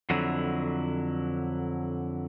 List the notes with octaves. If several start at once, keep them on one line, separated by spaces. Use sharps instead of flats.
F2 D3 F#3 E4